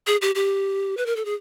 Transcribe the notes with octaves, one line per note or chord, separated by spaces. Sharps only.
G#4
G4
G4
B4
A#4
A4
G#4